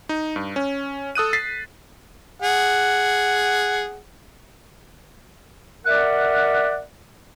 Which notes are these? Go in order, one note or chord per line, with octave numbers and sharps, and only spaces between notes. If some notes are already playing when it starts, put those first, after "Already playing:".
D#4
G2
C#4
A4 D#6 F#6 D#7
A6 B6 C7
G#4 F#5
A#4 D5 E5 F#5